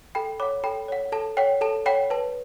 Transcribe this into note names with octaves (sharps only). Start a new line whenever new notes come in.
A4 G5 B5
C#5 F#5 B5 D6
A4 G5 B5
C#5 F#5
A4 A5
C#5 F#5 G5
A4 A5
C#5 F#5 G5 B5
B4 A5